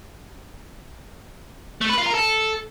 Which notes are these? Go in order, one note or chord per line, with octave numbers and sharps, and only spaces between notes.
A3
B4
F4
A#4
A4